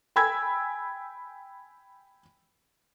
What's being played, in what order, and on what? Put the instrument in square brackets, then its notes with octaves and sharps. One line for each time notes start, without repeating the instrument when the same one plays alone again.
[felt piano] G5 G#5 B5 E6 G#6